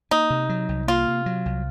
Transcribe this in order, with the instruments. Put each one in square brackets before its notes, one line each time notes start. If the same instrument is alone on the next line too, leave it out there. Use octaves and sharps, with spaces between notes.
[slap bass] A#3 [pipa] D#4
[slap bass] C3
F#3
C2
[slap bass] A#3 [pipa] F4
[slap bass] C3
F#3
C2